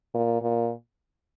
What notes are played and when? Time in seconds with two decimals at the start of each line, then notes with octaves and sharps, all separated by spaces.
0.14 A#2
0.42 A#2